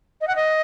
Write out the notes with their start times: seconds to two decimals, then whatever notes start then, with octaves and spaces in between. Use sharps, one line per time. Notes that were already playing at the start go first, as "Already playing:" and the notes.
0.20 D#5
0.27 F#5
0.35 D#5